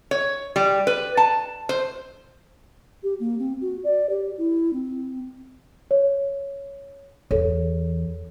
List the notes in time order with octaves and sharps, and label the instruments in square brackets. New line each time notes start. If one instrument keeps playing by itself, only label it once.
[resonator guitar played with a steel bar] C#5
G3
B4
A5
C5
[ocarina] G4
A#3
C4
F#4
D5
G4
E4
C4
[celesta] C#5
[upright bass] E2 [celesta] A4 C#5